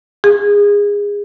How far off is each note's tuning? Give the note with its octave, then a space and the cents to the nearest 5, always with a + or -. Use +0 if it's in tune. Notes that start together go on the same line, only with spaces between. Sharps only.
G#4 -25